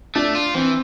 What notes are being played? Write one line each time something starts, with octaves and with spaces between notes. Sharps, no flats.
A3 D4
F4
E3 C4